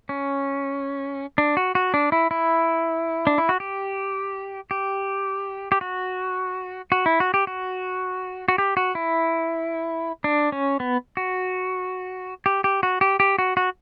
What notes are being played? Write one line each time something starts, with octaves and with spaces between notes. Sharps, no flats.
C#4
D4
F#4
F#4
D4
E4
E4
D4
E4
F#4
G4
G4
G4
F#4
F#4
E4
F#4
G4
F#4
F#4
G4
F#4
E4
D4
C#4
B3
F#4
G4
G4
F#4
G4
G4
F#4
F#4